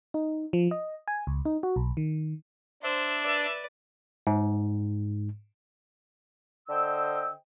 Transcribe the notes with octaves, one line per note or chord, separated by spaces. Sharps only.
D#4
F3
D#5
G#5
C#2
D#4
F#4
B1
D#3
D4 C5 E5
B4 D5
G#2
D3 C5 D#5 G5 E6